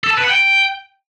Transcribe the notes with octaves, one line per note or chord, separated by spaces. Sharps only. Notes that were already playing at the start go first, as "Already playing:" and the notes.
A4
A5
B4
F#5
G5